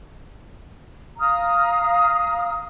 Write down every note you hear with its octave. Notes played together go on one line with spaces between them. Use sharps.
F5 A#5 D#6 F6